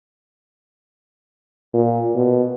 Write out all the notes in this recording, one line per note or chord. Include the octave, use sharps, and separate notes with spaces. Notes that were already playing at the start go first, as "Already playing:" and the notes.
A#2
B2